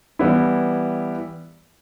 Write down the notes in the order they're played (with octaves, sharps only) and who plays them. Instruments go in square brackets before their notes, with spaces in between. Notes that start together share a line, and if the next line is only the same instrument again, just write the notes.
[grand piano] E3 G3 B3 E4